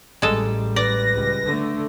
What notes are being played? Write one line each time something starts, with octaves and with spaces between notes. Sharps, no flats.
A1 G3 G#3 A4
B4 D5 A#6
C#2 G3
D3 A3